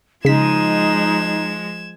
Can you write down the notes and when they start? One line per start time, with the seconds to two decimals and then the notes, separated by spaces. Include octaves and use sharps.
0.25 C#3 F3 G#3 D#4 G#6 B6 E7